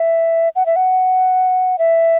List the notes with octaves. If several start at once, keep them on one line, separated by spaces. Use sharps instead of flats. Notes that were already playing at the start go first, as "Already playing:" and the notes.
Already playing: E5
F#5
E5
F#5
E5